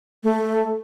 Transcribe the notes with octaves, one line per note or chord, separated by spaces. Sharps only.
A3